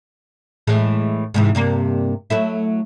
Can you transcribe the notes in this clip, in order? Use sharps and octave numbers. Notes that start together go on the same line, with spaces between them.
A2 E3 G#3
G#2 C3 E3
G2 C3 A#3
F#3 A3 E4